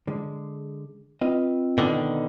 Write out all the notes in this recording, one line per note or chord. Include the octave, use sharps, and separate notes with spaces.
D3 G#3
C4 F4 B4 D#5
B2 D3 D#3